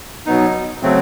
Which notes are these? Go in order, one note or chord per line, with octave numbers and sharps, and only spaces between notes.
B2 F#3 B3 D#4
C#3 F#3 A3 C4